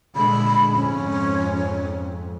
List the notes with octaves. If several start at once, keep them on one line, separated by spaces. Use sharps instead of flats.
A#2 D3 G#3 B5
F2 G#2 C#4